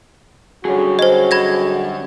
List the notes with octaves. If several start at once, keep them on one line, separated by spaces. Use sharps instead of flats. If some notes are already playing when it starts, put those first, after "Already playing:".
D3 F#3 G3 C#4 F#4 G#4 C#5
C5 D#5
B5 G#6 A#6